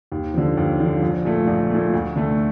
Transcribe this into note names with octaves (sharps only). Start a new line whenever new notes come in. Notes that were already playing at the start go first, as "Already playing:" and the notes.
D#2
D3 F3
D#2
D3 F3
A#1
A#2 A3
A#1
A#2 A3
D2
D3 A3